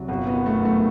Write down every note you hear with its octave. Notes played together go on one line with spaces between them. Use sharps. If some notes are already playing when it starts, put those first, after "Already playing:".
Already playing: C2 F#3
G1 F#4
B3
D#3
A3
F#2
A3